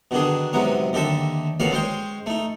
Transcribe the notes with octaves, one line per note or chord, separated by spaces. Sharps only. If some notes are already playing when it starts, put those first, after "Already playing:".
B2 D3 D#3 D4 G#4
G#2 C3 F#3 B3 C#4
D#2 D3 G4 A4 E5
D#2 B2 C#4 A4 D5 F5
G#3 C#4 C5 G5
A3 D#4